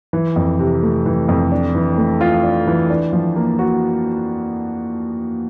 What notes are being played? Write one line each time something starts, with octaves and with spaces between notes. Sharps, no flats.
E3
F2
C3
A3
E3
F2
D4
E3
A3
F4
D4
E3
D4
F3
A#3
F#4